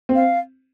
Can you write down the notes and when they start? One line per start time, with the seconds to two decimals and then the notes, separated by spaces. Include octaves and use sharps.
0.09 C4
0.15 F5